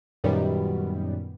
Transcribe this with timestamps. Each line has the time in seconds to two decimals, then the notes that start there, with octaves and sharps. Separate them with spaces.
0.24 F#2 A#2 D#3 G3 B3